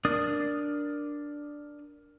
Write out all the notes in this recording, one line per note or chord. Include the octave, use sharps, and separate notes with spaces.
D4 A#4 D5 D#6